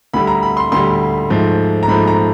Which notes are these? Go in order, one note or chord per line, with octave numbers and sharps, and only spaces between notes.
D2 D3 G3 B5
A#5
B5
C6
D2 D3 G3 C6
G#2 F3 A3
A#5
G#2 F3 A3 B5
A#5